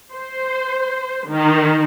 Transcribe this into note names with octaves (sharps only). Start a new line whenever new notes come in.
C5
D#3